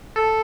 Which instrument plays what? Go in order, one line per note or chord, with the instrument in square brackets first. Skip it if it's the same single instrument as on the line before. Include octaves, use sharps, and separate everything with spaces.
[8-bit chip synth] A4